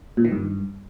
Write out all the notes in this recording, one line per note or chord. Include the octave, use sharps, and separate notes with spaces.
A#2
D#3
G2